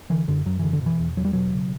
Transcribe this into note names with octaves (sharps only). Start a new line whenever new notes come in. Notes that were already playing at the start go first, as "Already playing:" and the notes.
D3 E3
F#2 D3
F#2 F#3
D3 E3
D3
B2 E3
E2
E2 F#3
G3
B2 F#3
C#3